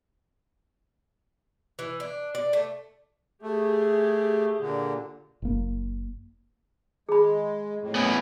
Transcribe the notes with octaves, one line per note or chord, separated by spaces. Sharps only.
E3
D4
D5
A3
A3 G4 G#4
A#2 D3
F#1 A#3
G#3 G#4 B5
F2 A2
B3 C#4 E4